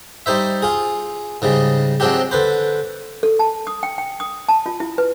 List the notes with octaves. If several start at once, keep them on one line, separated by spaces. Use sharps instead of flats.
G3 D#4 C5 E5
F4 G#4
G#2 C#3 G3 G#3
F3 F#3 G#3 C4 D4 G4
D3 B4 C5
A4
A5
D#6
G5
G5
D#6
A5
F4
E4
B4